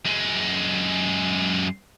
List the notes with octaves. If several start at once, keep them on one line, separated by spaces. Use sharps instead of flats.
F#2 G#3